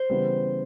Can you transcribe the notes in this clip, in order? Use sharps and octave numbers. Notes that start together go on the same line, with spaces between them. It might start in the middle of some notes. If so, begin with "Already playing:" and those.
Already playing: C5
C#3 E3 G3 B3